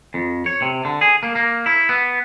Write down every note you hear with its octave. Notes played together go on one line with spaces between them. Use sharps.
F2
C#5
C3
D3
G#4
A#3
A#3
E4
B3